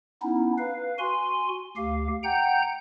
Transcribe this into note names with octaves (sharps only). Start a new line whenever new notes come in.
B3 C#4 D#4 E4
B4 F5
F#4 G#5 C6
D2 G4 F5
F#5 G5 A#5 G6